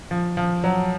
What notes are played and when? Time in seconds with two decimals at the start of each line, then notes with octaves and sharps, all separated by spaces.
0.11 F3
0.37 F3
0.64 F#3